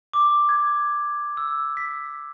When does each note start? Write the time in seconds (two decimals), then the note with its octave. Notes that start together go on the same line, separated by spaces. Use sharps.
0.13 D6
0.49 G#6
1.37 E6
1.77 B6